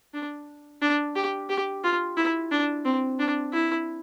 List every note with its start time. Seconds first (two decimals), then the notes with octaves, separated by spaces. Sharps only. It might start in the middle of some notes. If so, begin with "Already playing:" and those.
0.14 D4
0.82 D4
1.16 G4
1.50 G4
1.84 F4
2.17 E4
2.51 D4
2.85 C4
3.19 D4
3.53 E4